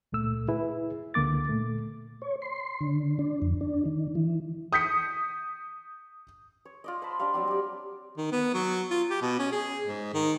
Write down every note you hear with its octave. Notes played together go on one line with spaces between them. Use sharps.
C#2 A#2 A3 E6
E4 G#4 B4
C#2 D3 A#3 D6 A6
A#2 A3
C#5
C6
D3
D4
F2
D4
D#3
E3
D#6 G6 B6 C#7
C#5
F4 D5 D#5
C5 A5 B5
D4 G4 D#5 F5
F#3 G3 C4 G4
G4 D5
D#3
B3
F#3
F4
G4
B2
C#4
G#4
G#2
D#3